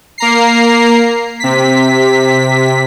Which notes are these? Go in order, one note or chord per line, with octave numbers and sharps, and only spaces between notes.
A#3 A#5 C7
C3 B6